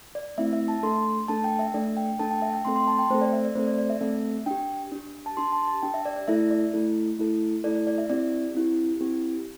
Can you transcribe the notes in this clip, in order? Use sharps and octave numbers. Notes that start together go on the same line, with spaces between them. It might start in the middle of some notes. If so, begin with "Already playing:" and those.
D5
A3 C4 E4 E5
E5
A5
A3 D4 A4 C6
A3 D4 A4 A5
G5
E5
A3 D4 A4 D5
G5
A3 D4 A4 A5
G5
E5
G5
A3 C4 A4 C6
C6
A5
G5
A3 C4 A4 C5
D5
E5
D5
A3 C4 A4 C5
D5
D5
E5
A3 C4 A4 E5
D4 G4 G5
D4 G4
A5
D4 G4 C6
A5
A5
D4 G4 G5
E5
D5
D5
A3 E4 A4 E5
D5
A3 E4 A4
A3 E4 A4
A3 E4 A4 D5
D5
D5
E5
C4 E4 G4 D5
C4 E4 G4
C4 E4 G4